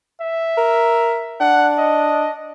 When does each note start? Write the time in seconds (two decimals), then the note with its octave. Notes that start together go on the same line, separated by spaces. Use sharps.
0.21 E5
0.57 A#4
1.40 D4 F#5
1.78 D#5